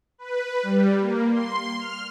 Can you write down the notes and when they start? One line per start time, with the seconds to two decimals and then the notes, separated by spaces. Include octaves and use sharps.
0.18 B4
0.63 G3
0.99 A#3
1.32 C6
1.78 F6